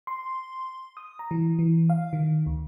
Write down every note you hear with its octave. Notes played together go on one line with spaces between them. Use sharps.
C6
D#6
A#5
E3
E3
F5
D#3
D2